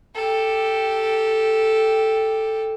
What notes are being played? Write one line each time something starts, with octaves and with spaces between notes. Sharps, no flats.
G4 A4